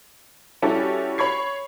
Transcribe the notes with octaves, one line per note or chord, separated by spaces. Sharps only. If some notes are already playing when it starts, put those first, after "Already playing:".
G3 C#4 E4 F#4 G4 A4
C#5 B5 C#6 G#6 C7